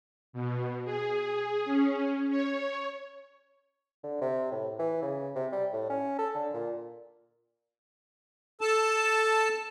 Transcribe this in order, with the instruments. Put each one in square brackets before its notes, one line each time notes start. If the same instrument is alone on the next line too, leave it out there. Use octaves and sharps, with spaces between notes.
[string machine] B2
G#4
C#4
C#5
[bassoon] D3
C3
A2
E3
C#3
C3
G3
A2
C#4
A4
D3
A#2
[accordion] A4 A5